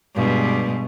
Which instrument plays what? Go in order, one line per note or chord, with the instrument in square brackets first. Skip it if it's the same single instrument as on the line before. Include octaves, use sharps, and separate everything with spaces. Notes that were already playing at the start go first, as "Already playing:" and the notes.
[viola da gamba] G2 B2 G#3